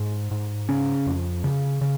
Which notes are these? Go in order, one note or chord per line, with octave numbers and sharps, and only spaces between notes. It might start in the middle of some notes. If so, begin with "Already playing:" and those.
Already playing: G#2
G#2
C#3 C#4
F2
C#3
C#3